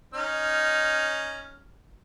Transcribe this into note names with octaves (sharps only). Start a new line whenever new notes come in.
C#4 D#4 F6